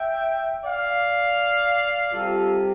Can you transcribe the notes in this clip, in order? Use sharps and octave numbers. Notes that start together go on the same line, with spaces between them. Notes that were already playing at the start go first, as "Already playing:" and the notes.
Already playing: E5 G5
D5 F5
C3 G3 F4 A4